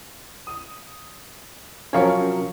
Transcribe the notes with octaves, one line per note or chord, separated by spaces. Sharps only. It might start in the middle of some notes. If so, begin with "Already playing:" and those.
D#6
C3 F3 F#3 C#4 A#4 C#5 F5 C#6